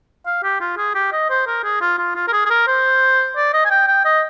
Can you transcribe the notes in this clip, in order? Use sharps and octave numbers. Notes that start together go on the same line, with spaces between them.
F5
G4
F4
G#4
G4
D#5
C5
A#4
G#4
F4
F4
F4
A#4
G#4
G#4
A#4
C5
D5
D#5
G#5
G5
G5
D#5